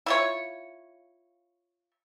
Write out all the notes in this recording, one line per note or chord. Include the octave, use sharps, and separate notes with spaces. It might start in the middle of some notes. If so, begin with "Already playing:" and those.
E4 F4 C#5